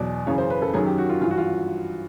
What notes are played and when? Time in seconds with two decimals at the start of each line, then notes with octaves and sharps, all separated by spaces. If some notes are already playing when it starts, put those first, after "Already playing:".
Already playing: E2 B2 F#3 D5
0.26 F#2 C#3 E3 C#5
0.38 C5
0.50 B4
0.62 A4
0.73 F#2 D#3 F#3 G#4
0.86 G4
0.98 F#4
1.10 F4
1.21 G2 E3 F4
1.31 F#4
1.38 F4